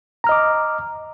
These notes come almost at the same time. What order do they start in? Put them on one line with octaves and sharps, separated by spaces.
A#5 F6 D#5 D6